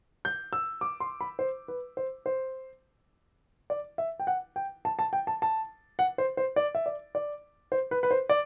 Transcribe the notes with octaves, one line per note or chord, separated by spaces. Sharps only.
G6
E6
D6
C6
B5
C5
B4
C5
C5
D5
E5
G5
F#5
G5
A5
A5
G5
A5
A5
F#5
C5
C5
D5
E5
D5
D5
C5
B4
B4
C5
D5